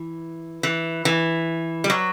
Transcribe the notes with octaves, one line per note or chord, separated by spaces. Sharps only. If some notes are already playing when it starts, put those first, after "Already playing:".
Already playing: E3
E3
E3
G3
F#3